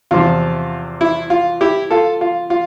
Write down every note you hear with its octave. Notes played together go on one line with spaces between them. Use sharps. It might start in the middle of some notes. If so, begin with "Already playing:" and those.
E2 C3 F3 F4
E4
F4
E4 G4
F4 A4
F4
F4